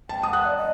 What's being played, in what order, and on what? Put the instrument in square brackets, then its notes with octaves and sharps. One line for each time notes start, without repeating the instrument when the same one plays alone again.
[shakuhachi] G5 [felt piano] A5
[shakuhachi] F#5 [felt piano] D#6
[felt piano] F#6
[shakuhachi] D5
D#5